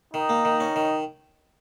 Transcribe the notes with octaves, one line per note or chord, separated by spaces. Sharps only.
D#3 D#4
A#3
D#3
C#4
D#3